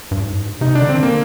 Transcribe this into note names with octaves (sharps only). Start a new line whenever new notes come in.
G2
G#2
C3 D#4
D4
D3
C4
D#3
D3 A#3